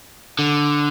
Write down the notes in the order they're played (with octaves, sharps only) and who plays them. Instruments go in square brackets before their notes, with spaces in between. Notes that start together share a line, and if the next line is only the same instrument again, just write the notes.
[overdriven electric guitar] D3